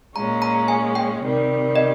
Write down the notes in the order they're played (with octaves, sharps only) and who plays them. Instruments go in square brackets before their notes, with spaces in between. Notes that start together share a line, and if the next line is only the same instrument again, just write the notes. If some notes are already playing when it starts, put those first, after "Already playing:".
[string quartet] A#2 G#3 C#4 [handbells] A#5
[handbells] A#5
G#5
G5
[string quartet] C3 D#3 G3
[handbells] D#5